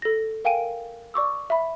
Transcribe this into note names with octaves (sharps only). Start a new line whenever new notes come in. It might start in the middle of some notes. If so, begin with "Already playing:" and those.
A4 A#6
A#4 F5 G5 G#5 D7 D#7
D5 C#6 D6 E6
E5 B5